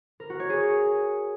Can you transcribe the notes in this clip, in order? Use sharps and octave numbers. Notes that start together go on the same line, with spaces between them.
A#4
F#4
C#5
G#4